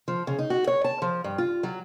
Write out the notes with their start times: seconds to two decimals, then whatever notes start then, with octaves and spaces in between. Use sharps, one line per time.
0.08 F3
0.27 C#3
0.39 D#4
0.50 F#4
0.67 C#5
0.84 A5
1.02 F3
1.24 G2
1.38 F4
1.63 F#3